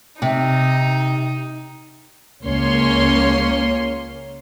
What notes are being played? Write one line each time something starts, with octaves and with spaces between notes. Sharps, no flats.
C3 D#4
C#2 A#3 C#4 C#5 C6